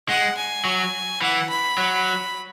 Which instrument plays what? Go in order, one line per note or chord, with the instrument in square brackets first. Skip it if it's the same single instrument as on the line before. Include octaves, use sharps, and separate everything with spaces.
[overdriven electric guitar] G#3 [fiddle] F#5
[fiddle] G#5
[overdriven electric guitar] F#3
[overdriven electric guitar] E3 [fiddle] F#5
[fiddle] B5
[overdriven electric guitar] F#3